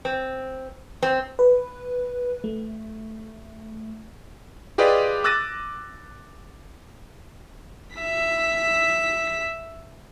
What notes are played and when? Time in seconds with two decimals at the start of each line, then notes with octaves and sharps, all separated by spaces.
0.05 C4
1.03 C4
1.39 B4
2.44 A3
4.78 F4 G4 G#4 B4 D5 D#5
5.24 D6 E6 F#6 A6 A#6 D#7
7.95 E5 B6